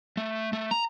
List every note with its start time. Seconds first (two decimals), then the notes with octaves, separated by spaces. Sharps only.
0.17 A3
0.53 A3
0.71 A#5